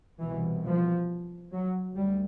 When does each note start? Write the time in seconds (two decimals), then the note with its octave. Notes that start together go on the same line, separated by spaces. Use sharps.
0.20 C2 B2 E3
0.64 F3
1.52 F#3
1.96 D2 G3